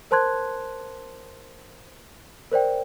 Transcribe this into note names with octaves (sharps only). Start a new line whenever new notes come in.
A#4 C5 A5 C6 F#6 G#6
A#4 C5 D5 G5